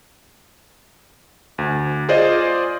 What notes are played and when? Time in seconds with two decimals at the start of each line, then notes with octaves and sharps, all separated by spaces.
1.58 D2
2.09 F4 G#4 C5 D5 D#5